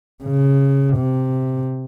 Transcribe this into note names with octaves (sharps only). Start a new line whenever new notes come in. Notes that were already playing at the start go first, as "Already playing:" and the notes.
C#3
C3